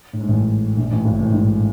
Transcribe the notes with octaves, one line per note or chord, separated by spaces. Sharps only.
A2
G#2
A1 A2
A#1 A#2
A1 A2
G#1 G#2
A1 A2
G#1 G#2